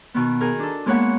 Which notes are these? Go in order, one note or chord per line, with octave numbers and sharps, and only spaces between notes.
B2 D#3 B3
D#4 G#4 A#4
D4 A4
G#3 A#3 B3 C#5 F#5